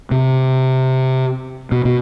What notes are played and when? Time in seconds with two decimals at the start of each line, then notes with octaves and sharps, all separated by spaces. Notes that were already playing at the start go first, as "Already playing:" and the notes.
0.11 C3
1.72 B2
1.85 B2